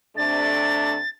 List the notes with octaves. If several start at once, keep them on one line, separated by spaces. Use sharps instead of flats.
C3 A3 D4 A6